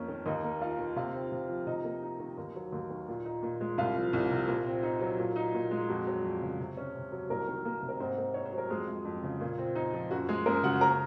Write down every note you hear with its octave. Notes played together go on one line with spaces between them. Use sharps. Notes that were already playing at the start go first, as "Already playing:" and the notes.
Already playing: F2 A#3 C#4
D#3
D#2 D#4 D#5
A#3
D#4 F4 F5
D#3
C3 F4 F5
C4
C3
F3
C3 D#4 D#5
A#3
D#4
D#3
D#2
F#3
D#2
D#3
A#2
D#4
A#2
G#3
C2 F4 F5
F3
C2
C3
A#2
C4
D#4
F#3
A#2
D#4
A#2
G#3
F2 F#4
F#3
F2
C#3
C3
C#4
C3
F#3
C2 A#3 A#4
D#3
A#3
C3
A#4
G#2 C4 C5
A#3
D#4 C#5
C5
F#3
A#4
F2 G#3 G#4
G#3
F2
C#3
A#2
C4
D#4
F3
F#2 F#4
G#3 G#4
F#2 A#3 A#4
C#3 F#4 F#5
A#4 A#5